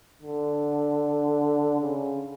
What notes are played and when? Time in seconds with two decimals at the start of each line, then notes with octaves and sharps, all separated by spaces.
0.22 D3
1.81 C#3